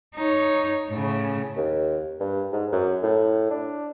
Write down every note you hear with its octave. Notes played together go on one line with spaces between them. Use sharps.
D#4 C#5
A2 C#3
D#2
G2
G#2
F#2
A2
D4